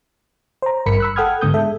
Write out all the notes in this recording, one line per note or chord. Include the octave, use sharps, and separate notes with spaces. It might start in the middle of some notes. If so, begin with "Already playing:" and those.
C5 A#5
G#1 G2 A#4 B5 B6 C#7
B5 E6 F#6
A4 F#5 G5 D#6 F6 G#6
G#2 D3 B3 D#6 G6
G#3 A4 E5